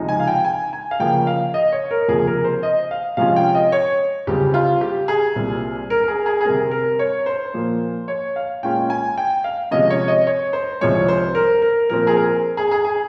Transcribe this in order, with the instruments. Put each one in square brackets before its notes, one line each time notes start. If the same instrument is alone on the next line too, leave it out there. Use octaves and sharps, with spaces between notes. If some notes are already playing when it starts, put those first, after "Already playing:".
Already playing: [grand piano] C#2 C3 F3 G#3 D#4
G#5
F5
G5
G#5
G#5
F5
C#3 F3 A#3 C#4 G5
F5
D#5
C#5
A#4
C#2 C3 F3 A#3 G#4
A#4
C5
D#5
F5
C3 F3 G#3 C#4 F4 F5
G5
D#5
C#5
C#2 C#3 G3 C4 G4
F4
G4
G#4
C2 A#2 G3 C4
A#4
A#4
G#4
G#4
G#4
C3 G3 C4 A#4
A#4
C#5
C5
A#2 F3 A#3
C#5
F5
A#2 G#3 C#4 F4 G5
G#5
G5
F5
C3 F3 G#3 C#4 D#5
C#5
D#5
C#5
C5
C2 C3 F3 G#3 C#5
C5
A#4
A#4
A#2 F3 C4 A#4
G#4
A#4
G#4
G#4
G#4